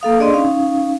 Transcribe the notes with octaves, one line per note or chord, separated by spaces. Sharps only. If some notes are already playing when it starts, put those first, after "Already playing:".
A#3 A4 F5 D#6
D4 G#4 D5 D#5 C6
C#4 D#4 F5